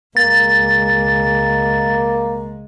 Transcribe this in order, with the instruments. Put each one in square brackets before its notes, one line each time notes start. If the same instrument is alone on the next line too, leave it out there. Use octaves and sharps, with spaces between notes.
[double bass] C#2 G#3 [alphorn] A#3 [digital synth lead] A6